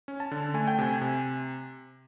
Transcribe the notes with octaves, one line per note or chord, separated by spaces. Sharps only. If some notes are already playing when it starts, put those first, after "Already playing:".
C#4
A5
D3
A3 G#5
G5
C3 G#5
C3